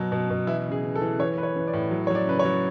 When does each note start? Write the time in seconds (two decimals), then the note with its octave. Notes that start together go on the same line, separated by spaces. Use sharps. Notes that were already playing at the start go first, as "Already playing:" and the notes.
Already playing: B2 F#3
0.12 B2
0.30 B2
0.47 E3 E4
0.66 C#3
0.72 G#4
0.83 C#3
0.95 A4
1.02 E3
1.19 E3 C#5
1.37 E3 B4
1.43 C#5
1.56 E3
1.68 D5
1.73 A2
1.91 F#3
2.07 F#3 C#5
2.15 D5
2.27 C#3 B4
2.39 C#5
2.45 F#3